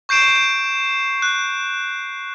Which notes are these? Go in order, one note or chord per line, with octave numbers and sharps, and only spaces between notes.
C#6 G6 C7 D7 E7
F#6